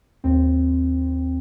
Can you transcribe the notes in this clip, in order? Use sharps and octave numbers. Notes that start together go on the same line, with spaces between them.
D#2 C4